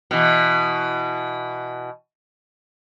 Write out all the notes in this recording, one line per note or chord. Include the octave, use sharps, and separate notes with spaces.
B2 E3